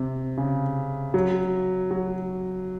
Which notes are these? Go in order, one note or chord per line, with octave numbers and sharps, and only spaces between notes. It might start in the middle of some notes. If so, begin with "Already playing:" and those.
Already playing: C3
C#3
F#3
F#3